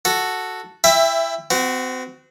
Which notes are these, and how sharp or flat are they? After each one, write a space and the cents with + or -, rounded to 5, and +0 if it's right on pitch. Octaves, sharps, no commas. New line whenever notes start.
F#4 +0 A4 +0
E4 +20 E5 +5 G5 +30
C4 -35 F#4 +0